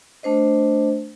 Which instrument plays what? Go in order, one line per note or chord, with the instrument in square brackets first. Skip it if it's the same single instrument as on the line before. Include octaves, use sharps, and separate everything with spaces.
[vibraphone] A3 D4 C5 D#5